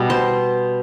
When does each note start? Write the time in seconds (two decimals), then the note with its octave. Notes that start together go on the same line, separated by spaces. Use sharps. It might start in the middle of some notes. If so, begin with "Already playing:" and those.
Already playing: B2 G3 B3
0.10 C5